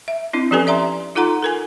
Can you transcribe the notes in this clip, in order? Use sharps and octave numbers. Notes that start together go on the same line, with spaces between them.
E5
C4 D4 E4
F3 C#4 G4 A4 B4 G#5
D5 E5 A#5 C6
D#4 F4 A4 F#5 A#5 C6
A4 A#4 G#5